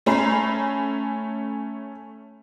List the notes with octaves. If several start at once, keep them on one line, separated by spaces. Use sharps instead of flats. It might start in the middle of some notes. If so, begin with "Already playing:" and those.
A3 C#4 A#5 B5 C7